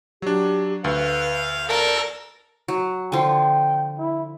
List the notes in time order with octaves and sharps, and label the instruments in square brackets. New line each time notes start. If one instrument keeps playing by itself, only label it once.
[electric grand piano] F#3 D4 [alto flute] G4
[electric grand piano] D2 [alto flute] B4 [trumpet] F5
[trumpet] A4 [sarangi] A#4 [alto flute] D5
[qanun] F#3
[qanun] D3 F3 [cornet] G5
[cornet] E4